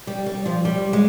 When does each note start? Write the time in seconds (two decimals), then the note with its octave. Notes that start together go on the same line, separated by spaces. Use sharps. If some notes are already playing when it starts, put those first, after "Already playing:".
0.07 G3
0.26 G3
0.46 F3
0.65 G3
0.93 G#3